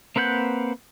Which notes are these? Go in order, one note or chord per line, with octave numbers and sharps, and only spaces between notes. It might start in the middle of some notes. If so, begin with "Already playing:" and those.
A#3 C4 B4 F#5 G6